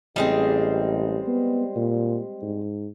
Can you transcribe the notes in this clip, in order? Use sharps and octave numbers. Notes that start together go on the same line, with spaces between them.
A1 G3 G#3 C4
B3
A#2
G#2